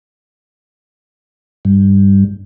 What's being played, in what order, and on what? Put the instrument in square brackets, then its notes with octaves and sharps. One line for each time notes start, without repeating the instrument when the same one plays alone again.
[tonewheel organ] G2